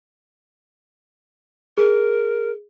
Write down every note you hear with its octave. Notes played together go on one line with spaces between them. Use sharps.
G#4 A#4